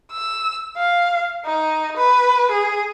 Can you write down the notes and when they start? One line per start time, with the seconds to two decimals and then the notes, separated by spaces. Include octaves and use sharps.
0.12 E6
0.77 F5
1.45 D#4
1.97 B4
2.51 G#4